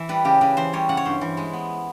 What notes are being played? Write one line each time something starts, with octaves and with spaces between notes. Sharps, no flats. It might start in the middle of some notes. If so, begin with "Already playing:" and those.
Already playing: E3 E5
G3 B4
C#3 G4
C#3 B4
E3 C5
G3 C#5
C#3 F#5
C#5
G2 C5
E3
G#3
B3